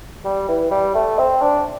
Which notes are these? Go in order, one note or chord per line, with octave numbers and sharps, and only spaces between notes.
G3
E3
G3
A3
C4
D4